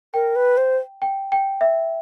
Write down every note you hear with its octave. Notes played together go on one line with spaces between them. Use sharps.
A#4 G5
B4
C5
G5
G5
E5